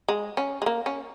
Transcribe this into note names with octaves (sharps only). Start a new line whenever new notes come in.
G#3
C#4
G#3
A#3
C#4